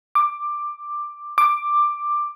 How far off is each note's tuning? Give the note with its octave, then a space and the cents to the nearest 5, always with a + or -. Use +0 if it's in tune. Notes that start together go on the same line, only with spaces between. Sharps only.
D6 +10
D6 +10